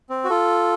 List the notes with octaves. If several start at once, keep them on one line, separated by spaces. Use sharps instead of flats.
C4
F#4
F4 A4